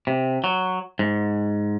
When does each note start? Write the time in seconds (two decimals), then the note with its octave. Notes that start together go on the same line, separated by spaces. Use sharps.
0.07 C3
0.44 F#3
0.99 G#2